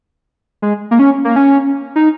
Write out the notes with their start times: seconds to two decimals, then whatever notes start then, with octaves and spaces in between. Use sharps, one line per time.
0.62 G#3
0.91 A#3
0.99 C#4
1.25 A#3
1.36 C#4
1.96 D#4